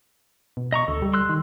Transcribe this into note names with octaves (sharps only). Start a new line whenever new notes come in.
B2
D#5 A#5 C#6
D2 A4
G3
C6 E6 F#6
D#3